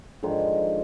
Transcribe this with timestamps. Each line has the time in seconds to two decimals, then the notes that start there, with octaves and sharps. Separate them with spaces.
0.23 G#2 D3 D#3 F3